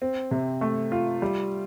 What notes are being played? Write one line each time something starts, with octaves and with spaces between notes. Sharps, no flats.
C4
C3
A3
F4
G3